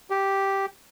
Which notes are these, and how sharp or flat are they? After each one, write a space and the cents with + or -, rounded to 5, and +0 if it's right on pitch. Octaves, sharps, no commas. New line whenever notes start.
G4 -5